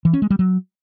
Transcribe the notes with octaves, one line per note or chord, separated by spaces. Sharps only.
E3
C#4
G#3
G3
F#3